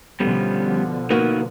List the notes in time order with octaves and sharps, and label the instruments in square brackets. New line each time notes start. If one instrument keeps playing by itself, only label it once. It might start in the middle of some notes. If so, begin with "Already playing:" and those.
[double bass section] B2 D3 F3 [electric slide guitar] G3 B3 C#4
[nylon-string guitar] A#3 B3 F#4 [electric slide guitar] D#4 A#4 B4